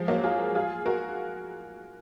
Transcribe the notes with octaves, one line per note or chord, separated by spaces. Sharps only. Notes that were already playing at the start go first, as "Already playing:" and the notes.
Already playing: F3 G#3
F#3 A#3
F4 G#4
F4 G#4
F#4 A#4